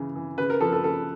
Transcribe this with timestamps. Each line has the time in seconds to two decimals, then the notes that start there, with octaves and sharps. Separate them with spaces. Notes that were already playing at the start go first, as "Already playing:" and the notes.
Already playing: C#3 E3
0.16 E3
0.38 C#3 B4
0.50 A#4
0.61 F3 A4
0.72 A4
0.83 C#3 A4